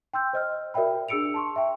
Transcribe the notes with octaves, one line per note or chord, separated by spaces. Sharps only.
G5 C6 E6 G6
C5 D#5 F6
F#4 A#4 D5 E5 G5 B5
D4 G#4 E6 C#7 D7 F7
A5 C6 C#6
E5 G5